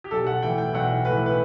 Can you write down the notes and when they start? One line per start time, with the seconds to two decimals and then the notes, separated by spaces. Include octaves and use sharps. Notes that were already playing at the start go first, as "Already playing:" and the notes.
0.04 G4
0.11 B1 A4
0.27 F#5
0.42 A2 E3 G5
0.58 G5
0.74 B1 F#5
1.05 A2 B4
1.10 E3
1.26 B4